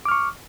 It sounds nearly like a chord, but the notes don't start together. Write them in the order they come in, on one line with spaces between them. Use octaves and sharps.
D6 F6 C#6